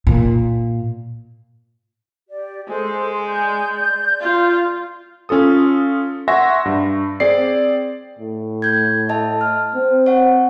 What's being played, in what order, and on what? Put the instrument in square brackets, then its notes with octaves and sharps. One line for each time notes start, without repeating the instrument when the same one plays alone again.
[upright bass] A#2
[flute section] G4 D5
[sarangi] G#3 [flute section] A4 C5
[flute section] D5 G6
[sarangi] F4
[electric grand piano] C#4 F4 A4 D#6
E5 F#5 G#5 C6 C#6 A#6
G2
C4 G#4 D5 C7
[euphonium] A2
[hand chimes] G6 G#6
D#5 E5 A5
F6
[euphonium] C4
[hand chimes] C#5 F#5